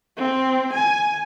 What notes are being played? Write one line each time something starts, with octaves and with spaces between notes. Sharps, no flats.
C4
G#5